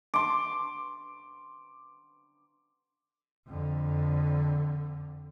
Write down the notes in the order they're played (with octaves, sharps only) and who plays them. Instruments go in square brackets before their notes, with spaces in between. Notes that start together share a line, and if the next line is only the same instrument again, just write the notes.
[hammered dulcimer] C6 D6
[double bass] F2 D3